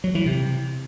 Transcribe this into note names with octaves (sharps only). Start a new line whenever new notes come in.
F#3
E3
C3